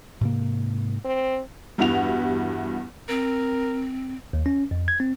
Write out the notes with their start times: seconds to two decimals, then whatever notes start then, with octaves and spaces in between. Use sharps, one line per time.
0.21 G#2 C3 A#3
1.05 C4
1.78 E2 G2 G3 E4 F#4 F7
3.09 C4 A#4
4.33 D#2
4.46 C#4
4.71 F2
4.88 G#6
5.00 C4